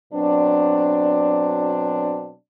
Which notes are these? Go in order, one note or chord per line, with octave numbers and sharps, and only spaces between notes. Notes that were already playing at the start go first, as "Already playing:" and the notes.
B2 F#3 C4 D4